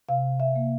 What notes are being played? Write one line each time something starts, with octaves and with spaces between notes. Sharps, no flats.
C3 F5
E5
A#3